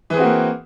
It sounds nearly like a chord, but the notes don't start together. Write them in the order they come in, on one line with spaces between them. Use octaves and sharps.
E3 G#4 C4 F#4 A#3